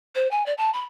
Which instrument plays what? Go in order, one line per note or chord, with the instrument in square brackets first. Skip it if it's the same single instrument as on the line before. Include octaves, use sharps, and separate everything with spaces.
[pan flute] C5
G#5
D5
A5
B5